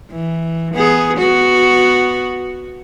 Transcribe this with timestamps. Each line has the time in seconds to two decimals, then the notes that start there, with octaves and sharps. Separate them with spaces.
0.11 E3
0.74 B3 G#4
1.17 B3 F#4